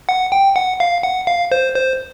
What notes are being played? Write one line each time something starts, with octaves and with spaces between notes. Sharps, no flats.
F#5
G5
F#5
F5
F#5
F5
C5
C5